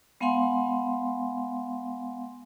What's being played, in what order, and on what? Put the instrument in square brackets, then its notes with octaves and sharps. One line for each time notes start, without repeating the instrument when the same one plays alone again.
[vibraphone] G#3 B3 F5 F#5 G#5 C6